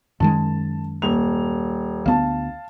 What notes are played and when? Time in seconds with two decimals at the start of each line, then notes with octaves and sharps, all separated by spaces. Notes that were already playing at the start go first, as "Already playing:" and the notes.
0.20 F#2 D#3 G#3 A5
1.02 D#1 F7
2.06 D2 B3 F5 A5